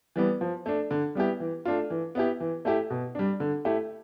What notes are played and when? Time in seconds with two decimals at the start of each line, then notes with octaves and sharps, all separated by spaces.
0.16 E3 G3 B3
0.41 F3
0.66 A3 D4
0.91 D3
1.15 G3 B3 E4 G4
1.40 E3
1.65 A3 D4 F4
1.90 E3
2.15 B3 E4 G4
2.40 E3
2.65 A3 E4 G4
2.90 B2
3.15 G3 D4
3.40 D3
3.65 A3 E4 G4